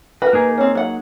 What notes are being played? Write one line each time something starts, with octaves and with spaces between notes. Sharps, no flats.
F#4 A#4 B4
A#3 D#4 G#4
C4 C#4
F#3 F#5